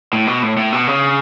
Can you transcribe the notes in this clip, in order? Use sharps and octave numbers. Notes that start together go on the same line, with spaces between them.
A2
B2
A2
A2
B2
C#3